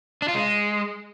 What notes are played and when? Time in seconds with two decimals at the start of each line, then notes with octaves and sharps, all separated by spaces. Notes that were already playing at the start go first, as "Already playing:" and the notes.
0.22 D4
0.28 F4
0.35 G#3